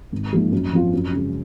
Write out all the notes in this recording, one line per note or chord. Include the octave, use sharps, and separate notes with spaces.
G#1
G#2 F3 A#3
F#2
F3 C4 F4
F#2
C#3 G#3